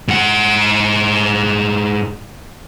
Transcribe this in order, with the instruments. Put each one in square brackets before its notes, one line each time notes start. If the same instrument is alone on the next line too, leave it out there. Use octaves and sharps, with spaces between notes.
[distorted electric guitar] G#2 F#5